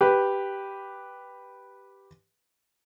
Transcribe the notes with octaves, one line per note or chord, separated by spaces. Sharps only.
G4 B4